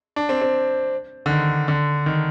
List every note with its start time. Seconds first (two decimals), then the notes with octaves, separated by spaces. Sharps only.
0.16 D4
0.29 C4
0.42 C4
1.26 D3
1.30 D#3
1.68 D3
2.06 D#3